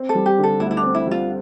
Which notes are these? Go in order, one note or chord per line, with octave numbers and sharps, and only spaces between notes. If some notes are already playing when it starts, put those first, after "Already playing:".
Already playing: C4
A4
G3
G4
D3
A4
D2 E4
E4
D4
C4
E4
G3 F4